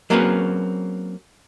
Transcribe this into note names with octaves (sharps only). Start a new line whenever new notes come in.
F#3 A#3 C4 C#4 G#4 B4